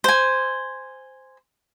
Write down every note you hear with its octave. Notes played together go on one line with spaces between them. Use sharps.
C5 G#5